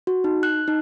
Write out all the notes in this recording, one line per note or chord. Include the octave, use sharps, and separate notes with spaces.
F#4
D#4
F#6
D#4